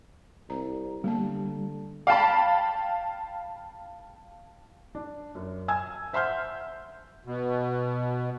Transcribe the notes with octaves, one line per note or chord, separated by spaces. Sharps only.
C2 A#5
D3 G3 A#3 B3 A5
F5 G5 A5 B5
D4
F#2
G#5 E6 G#6
C5 E5 F#5 C6 F6 G6
B2